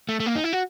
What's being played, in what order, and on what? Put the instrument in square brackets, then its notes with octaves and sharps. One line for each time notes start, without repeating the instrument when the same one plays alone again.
[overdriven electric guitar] A3
A3
A#3
D#4
E4
F#4